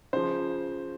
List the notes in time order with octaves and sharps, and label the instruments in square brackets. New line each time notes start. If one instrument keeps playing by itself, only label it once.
[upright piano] C#3 F3 C5